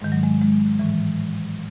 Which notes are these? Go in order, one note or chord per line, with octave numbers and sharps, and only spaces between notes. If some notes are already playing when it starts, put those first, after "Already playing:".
G#2 D#3 G#3
F#3
G#3
G#3
A2 E3